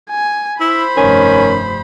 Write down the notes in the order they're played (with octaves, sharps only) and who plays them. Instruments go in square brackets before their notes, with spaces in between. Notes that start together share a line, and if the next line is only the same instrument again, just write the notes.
[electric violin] G#5
[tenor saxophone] E4 [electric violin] C5 B5
[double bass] F1 G2 [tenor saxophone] D#3 [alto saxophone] C#4